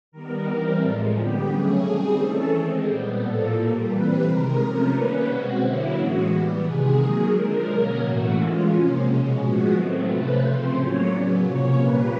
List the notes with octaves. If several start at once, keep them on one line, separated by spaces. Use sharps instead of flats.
D#3 G3 B3 A#4
E3 G3 C4 A#4
A2 F3 G#3 A4
D3 G3 B3 G4
C#3 F#3 A3 C#4 G#4
D#3 G3 C4 G#4
E3 A3 C#4 A4
D#3 G#3 C4 G#4
A#2 G3 B3 G4
A2 F3 A#3 A4
A#2 G3 A#3
E3 G3 C4 B4
C3 D#3 G#3 A#4
C3 F3 A3 C#4 A#4
D#3 G3 A#3 C#4 B4
B2 G#3 C4 F#4
D3 F#3 A#3 C#4 E4
A2 E3 G#3 F#4
E3 G3 B3 G4
C3 D#3 G#3 G#4
D#3 F#3 A#3 G#4
D3 F3 G#3 A#4
B2 F#3 A#3 C#4 A#4
A2 E3 A3 F#4
E3 G#3 C#4 F4
C3 F3 A#3 C#4
B2 G#3 C#4
A2 F3 G#3 B3 F#4
D#3 F#3 A3 C4
C3 F3 A3 C#4 B4
C#3 F3 A3 C4 C5
A2 F#3 A#3 C#4 C#5
C#3 F#3 B3 D5
C3 F3 A#3 C#4 C#5
A#2 G3 A#3 B4